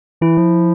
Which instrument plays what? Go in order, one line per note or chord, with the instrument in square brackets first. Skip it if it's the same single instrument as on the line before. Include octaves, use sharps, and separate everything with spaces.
[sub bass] E3 [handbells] E4
[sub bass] F3